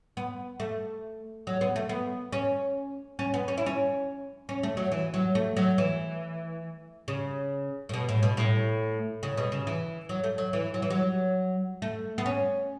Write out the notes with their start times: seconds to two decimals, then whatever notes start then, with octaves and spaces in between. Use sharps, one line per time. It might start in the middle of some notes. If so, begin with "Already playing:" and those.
0.17 B3
0.60 A3
1.47 F#3
1.61 B3
1.76 A3
1.89 B3
2.32 C#4
3.19 C#4
3.34 B3
3.48 C#4
3.58 E4
3.66 C#4
4.49 C#4
4.63 A3
4.77 F#3
4.92 E3
5.14 F#3
5.35 A3
5.57 F#3
5.78 E3
7.08 C#3
7.89 A2
7.94 B2
8.09 A2
8.23 B2
8.37 A2
9.23 C#3
9.37 B2
9.52 C#3
9.67 E3
10.09 F#3
10.24 A3
10.38 F#3
10.53 E3
10.74 F#3
10.82 E3
10.90 F#3
11.82 A3
12.18 B3
12.26 C#4